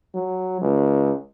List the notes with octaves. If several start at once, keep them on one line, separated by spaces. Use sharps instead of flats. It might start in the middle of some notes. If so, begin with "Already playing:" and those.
F#3
C#2